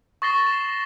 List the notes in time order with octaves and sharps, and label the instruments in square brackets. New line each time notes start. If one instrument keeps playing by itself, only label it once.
[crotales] C#6 D#6 A6 A#6 C7 G7
E7